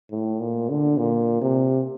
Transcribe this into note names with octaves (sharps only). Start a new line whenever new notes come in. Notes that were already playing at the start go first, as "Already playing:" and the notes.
A2
A#2
D3
A#2
C3